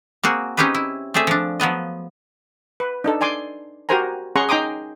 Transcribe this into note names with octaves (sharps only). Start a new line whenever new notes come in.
A#3 C4 F#4 G#4
C4 C#4 D#4 G4 G#4 B4
E4
A3 C4 G#4 D5 E5
F3 D4
F3 F#3 B3 D#5
B4
D4 D#4 A4
D5 G#5 C6 D6
F#4 G4 A#4 C5 G#5 A#5
C#4 G#4 F#5 A#5 C6 C#6
D#4 G5 A#5 C6 D6 D#6